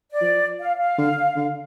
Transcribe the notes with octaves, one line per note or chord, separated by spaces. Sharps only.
D5
F3
F5
F5
D3
D3